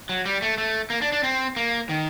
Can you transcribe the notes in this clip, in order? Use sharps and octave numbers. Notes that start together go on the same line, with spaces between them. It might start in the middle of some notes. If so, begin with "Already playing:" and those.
F#3
G3
A3
A3
A#3
D4
D4
C4
A#3
D#3